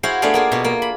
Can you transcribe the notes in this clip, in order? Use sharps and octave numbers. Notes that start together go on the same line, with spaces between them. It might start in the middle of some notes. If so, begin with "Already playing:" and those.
E4 F#4 G#4 C5 F5
A3 B3 D4 G#4 D5 F5
A#3 F4 G#4
B2 F4
A#3
B5